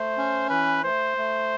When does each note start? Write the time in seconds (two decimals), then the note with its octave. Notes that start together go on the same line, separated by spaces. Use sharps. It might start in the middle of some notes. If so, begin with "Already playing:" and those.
Already playing: A3 C5
0.18 C#4
0.50 E3 B4
0.84 A3 C5
1.17 A3